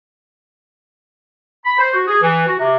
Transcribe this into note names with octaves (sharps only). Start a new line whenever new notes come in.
B5
C5
F#4
G#4
E3
F#4
C3